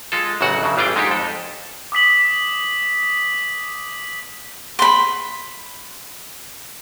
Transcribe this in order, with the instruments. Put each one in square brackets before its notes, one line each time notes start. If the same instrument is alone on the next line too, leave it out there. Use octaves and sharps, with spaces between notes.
[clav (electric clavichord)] G#3 F4 A4
A1 F#2 C#3 F#3 F#4 F#5
G2 C#3 F#3
A1 E3 G3 F4 G#4 G5
G#2 G#3 D4 D#4 G4
F2 A4
[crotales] D6 D#6 B6 F#7
[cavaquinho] B5 C6